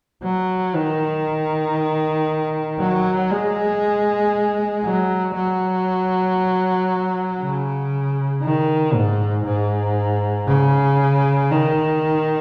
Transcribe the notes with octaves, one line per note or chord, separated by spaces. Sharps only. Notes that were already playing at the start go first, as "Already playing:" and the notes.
F#3
D#3
F#3
G#3
F#3
F#3
C#3
D#3
G#2
G#2
C#3
D#3